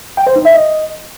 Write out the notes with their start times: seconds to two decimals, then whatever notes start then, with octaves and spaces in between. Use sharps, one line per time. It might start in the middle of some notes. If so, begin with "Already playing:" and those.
0.17 G5
0.27 C5
0.36 D#4
0.45 E5
0.54 D#5